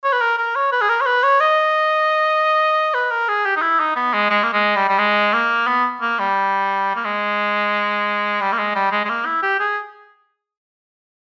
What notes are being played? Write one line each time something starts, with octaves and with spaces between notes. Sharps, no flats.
C#5
B4
A#4
A#4
C#5
B4
G#4
A#4
C#5
B4
C#5
D#5
B4
A#4
G#4
G4
D#4
E4
D#4
B3
G#3
G#3
A#3
G#3
G3
G3
G#3
A#3
B3
A#3
G3
A#3
G#3
G3
A#3
G#3
G3
G#3
G#3
A#3
E4
G4
G#4